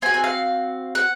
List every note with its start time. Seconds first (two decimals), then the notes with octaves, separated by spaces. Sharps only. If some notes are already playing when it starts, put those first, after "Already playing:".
0.02 C4 G#5
0.06 F#4
0.14 G#5
0.24 F5
0.95 F#5